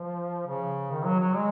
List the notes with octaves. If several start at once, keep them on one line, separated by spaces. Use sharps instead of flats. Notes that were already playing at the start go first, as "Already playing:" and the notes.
Already playing: F3
C#3
D#3
F#3
F#3
G#3